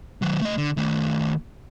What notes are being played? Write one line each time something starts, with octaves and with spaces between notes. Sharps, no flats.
D#3 F#3
A3 D#5
D3
D#3 A3